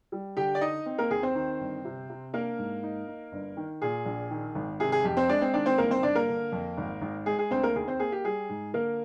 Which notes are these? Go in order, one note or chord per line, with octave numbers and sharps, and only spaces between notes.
G3
D3 G4 G5
D5
D#4 D#5
C4
A#3 A#4
D#2 G#4
C4 C5
D#3
G1
C3
C3
A#3 D4 A#4
G#2
D#4
D#4
G1
D#3
A#2 G#4
A#1
D#3
G#1
C3 G#4
G#4
F2 G4
C4 C5
G#3 D4 D5
C4 C5
D#3 D4 D5
C4 C5
G1 A#3 A#4
C4 C5
G1 D4 D5
A#3 A#4
D3
F2
G#1
G#1
G#3 G#4
G#4
D2 C4 C5
A#3 A#4
D#2 G#4
C4 C5
A#3 G#4
G4
G3 G#4
G#2
D3 A#3 A#4